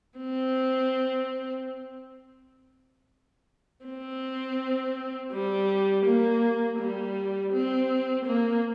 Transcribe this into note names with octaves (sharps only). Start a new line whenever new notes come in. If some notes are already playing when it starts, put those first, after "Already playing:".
C4
C4
G3
A#3
G3
C4
A#3